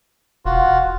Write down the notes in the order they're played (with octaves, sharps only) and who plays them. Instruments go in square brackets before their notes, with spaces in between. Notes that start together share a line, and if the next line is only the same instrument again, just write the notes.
[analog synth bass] E1 [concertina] F4 F#4